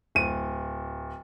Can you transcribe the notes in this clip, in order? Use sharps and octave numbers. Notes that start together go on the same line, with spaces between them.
D1 D#7